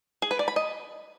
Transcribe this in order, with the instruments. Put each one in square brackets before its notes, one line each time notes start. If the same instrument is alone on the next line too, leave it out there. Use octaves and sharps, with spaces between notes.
[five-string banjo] G#4
B4
D5
B5
D#5